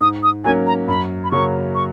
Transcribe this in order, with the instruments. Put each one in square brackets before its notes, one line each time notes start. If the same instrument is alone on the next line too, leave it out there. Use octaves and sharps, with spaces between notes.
[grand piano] G#2 [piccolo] D#6
[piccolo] D#6
[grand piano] F#3 A#3 C#4 [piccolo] G#5
[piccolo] A#5
[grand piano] F#2 [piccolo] B5
[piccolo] B5
[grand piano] C#3 F#3 A#3 C#4 [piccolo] C#6
[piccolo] C#6